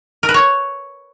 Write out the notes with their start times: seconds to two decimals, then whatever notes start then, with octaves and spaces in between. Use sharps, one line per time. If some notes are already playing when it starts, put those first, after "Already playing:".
0.23 A#4
0.29 B4
0.34 C#5